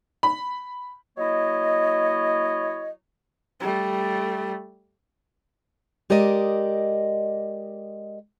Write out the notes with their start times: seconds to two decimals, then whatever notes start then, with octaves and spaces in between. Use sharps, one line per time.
0.23 B5
1.18 F#3 A#3 E4 C#5 D#5
3.60 G3 A3
6.10 G#3 G4 A#4 D5 D#5